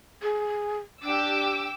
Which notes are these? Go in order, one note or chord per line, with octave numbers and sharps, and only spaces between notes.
G#4
D4 G4 D6 E6